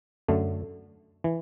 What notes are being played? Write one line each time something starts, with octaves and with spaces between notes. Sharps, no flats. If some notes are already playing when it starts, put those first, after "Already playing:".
F#2 D3 A3
E3